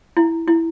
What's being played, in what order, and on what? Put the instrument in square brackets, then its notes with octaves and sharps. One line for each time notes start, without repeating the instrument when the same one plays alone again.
[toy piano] E4
E4